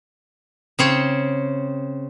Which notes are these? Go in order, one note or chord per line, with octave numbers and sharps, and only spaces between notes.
C#3 C4 C#5